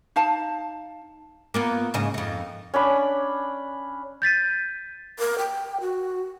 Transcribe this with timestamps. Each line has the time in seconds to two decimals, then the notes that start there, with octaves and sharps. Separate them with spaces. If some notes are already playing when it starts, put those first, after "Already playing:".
0.16 D#4 F5 A5
1.54 A#3 B3 F4
1.94 G#2 C#3 D#5
2.14 F2 D#4
2.74 C#4 D4 B5
4.22 G6 A6 B6 D#7
5.19 A#4
5.39 G5
5.81 F#4